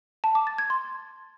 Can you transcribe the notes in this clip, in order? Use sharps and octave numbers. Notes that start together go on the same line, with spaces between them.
A5
D6
A6
G#6
C6